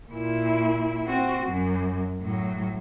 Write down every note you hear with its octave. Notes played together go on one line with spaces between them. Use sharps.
A#2 E4
C4 F#4
F#2
A2 F#3